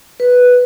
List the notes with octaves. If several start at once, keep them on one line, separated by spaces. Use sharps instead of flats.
B4